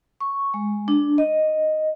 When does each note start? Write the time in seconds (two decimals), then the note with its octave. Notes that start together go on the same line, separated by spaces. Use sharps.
0.21 C#6
0.54 G#3
0.88 D4
1.18 D#5